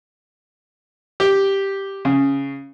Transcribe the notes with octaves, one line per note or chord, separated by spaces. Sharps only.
G4
C#3